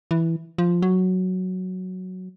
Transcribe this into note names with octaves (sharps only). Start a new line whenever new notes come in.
E3
F3
F#3